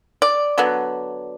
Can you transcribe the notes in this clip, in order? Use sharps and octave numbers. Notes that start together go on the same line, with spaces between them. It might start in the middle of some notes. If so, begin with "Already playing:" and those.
D5
D3 F#3 B3